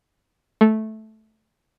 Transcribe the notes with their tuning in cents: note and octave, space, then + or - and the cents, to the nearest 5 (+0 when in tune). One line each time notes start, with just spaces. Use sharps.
A3 -10